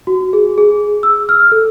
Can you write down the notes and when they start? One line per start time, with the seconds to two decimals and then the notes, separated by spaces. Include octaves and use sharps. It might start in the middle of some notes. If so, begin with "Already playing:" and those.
0.07 F#4
0.33 G#4
0.58 G#4
1.03 E6
1.29 F6
1.52 A4